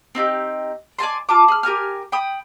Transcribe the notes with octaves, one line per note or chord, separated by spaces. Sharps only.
C4 D#4 F4 G4
D5 G#5 A5 C6
F4 A5 D6
G#4 F6
G4 A#4 G#5 F6
G5 B5 D#6